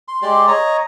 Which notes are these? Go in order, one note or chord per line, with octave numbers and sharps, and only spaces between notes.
C6
G#3 G4 D5 C6
C#5 D#5 A#5